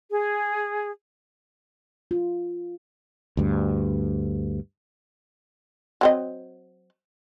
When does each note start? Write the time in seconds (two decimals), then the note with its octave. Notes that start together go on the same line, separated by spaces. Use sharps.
0.10 G#4
2.11 F4
3.37 D2 G2
6.01 F#3 C4 D#5